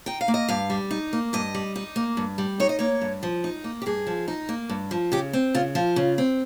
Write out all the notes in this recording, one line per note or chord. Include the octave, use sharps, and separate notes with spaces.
D#4 G5
F5
A#3
D#5
G2 F5
G3
D#4
A#3
G2 D#5
G3
D#4
A#3
G2
G3
D#4 C#5
D#5
A#3 C#5
G2
F3
D#4
A#3
G4
G2 G#4
F3
D#4
A#3
G2
F3
C#3 G4
C4
C#3 F4
F3 F4
C#3
C4